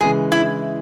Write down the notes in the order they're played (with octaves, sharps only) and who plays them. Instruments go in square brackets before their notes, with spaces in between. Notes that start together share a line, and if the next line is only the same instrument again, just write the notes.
[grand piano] C#3 E3 G#3 [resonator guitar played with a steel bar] G#4
[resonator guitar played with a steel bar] E4